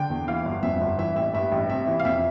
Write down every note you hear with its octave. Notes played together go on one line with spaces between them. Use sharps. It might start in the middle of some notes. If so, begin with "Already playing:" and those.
Already playing: D3 G5
E2
E3 F5
G1
F2 E5
G1
E3 E5
A1 E5
G2 E5
A1
C3 E5
E3
F5
F2 E5